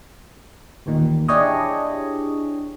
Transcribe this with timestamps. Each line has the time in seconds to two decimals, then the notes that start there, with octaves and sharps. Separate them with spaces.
0.86 A1 D#2 A#2 D#3
1.28 D4 E4 G4 G#4 C#5 D#5